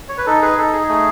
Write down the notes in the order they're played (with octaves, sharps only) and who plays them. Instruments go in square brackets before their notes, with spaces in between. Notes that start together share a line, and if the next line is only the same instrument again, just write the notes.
[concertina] C#5
B4
D#4 A4
G#4 B4
D#4 A4
G#4
A3 G#4